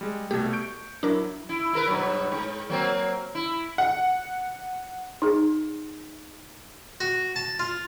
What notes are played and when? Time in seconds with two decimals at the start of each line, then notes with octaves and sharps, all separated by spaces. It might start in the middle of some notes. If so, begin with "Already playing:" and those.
0.01 G3 G#3
0.31 C2 B2 A3 G4 G#6
0.53 C#6 G6 D7
1.03 F#3 D4 E4 A#4
1.49 E4
1.73 E4 A#4 B4
1.88 G2 B2 F#3
2.32 G#2
2.69 F#3 A#3 C4
3.35 E4
3.78 F#5
5.22 D#4 G#4
7.00 F#4
7.36 A5
7.59 F4